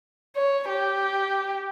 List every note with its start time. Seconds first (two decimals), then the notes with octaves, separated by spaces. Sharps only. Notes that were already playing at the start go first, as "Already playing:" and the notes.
0.36 C#5
0.68 G4